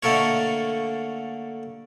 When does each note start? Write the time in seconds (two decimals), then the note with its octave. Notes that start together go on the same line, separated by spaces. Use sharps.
0.03 D3 A3 A#3 A4 A#4 C#5